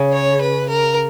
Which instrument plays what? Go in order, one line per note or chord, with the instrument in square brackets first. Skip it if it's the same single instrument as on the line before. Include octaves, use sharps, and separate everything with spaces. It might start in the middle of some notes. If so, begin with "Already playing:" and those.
Already playing: [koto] C#3
[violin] C#5
B4
A#4